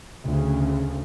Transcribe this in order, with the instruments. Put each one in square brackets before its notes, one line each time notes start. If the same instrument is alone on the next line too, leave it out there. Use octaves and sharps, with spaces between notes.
[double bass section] D2 C#3